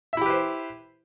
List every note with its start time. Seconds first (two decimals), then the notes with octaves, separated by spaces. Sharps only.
0.13 E5
0.17 E4
0.21 G4
0.26 B4
0.30 C5